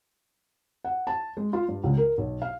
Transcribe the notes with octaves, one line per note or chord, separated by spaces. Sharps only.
F#5
A5
G#3
F4
G2
C#2
A#4
B1
F5